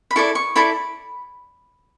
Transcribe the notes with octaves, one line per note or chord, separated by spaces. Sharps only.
B5
E4 A4 D5 C#6
C#6
E4 A4 D5 B5